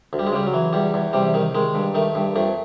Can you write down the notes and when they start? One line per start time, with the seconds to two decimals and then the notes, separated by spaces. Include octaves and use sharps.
0.13 D2
0.19 G3
0.27 G#3
0.32 C#3 G3
0.47 F#3
0.54 E3
0.73 E2 G3
0.94 E2
1.13 C3 G3
1.34 D#3
1.55 D#3 G#3
1.75 G2
1.95 D#3 A3
2.15 G2
2.36 F2 A3